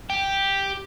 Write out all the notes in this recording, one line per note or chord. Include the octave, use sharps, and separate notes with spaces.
G4